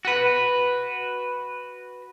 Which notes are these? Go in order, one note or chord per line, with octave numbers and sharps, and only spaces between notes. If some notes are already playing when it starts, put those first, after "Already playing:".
F#4 B4